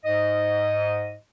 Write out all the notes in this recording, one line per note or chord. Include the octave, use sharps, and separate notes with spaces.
G#2 D#5